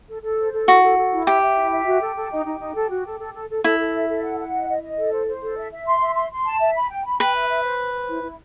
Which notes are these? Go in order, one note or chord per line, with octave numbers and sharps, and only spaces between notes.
A4
A4
C5
A4
E4 F#4
A4
A4
E4
G4 E5
E5
E4
E5
F#4
A4
A4
D#4
D#4
D#4
A4
F#4
A4
A4
A4
A4
E4 A4
A4
E5
A4
F#5
F#5
D#5
D#5
D#5
A4
C5
C5
A4
E5
E5
C6
E5
C6
C6
A5
E5
B5
G5
B5
B4 G5
E5
E5
C5
C5
C5
E4
E4